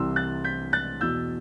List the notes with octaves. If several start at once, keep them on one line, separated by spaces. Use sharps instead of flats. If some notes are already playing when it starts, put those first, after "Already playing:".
Already playing: C2 C3 E3 C6 E6
F#6 A6
G6 B6
F#6 A6
E2 B2 E6 G6